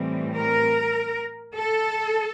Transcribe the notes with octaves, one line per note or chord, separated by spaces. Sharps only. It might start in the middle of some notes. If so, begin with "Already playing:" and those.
Already playing: A2 E3 G3 C4
A#4
A4